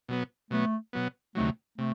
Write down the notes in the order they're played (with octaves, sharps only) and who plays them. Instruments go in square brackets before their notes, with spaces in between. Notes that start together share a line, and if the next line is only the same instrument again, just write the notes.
[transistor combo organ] B2 F#3 B3
[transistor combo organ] B2 F#3 B3 [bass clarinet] A3
[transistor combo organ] B2 F#3 B3
[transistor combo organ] D2 C3 D#3 F#3 [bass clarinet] A3
[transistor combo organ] C3 [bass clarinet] A3